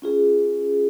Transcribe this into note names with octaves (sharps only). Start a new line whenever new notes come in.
C#4 F4 G#4